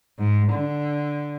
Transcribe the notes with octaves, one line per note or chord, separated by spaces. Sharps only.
G#2
D3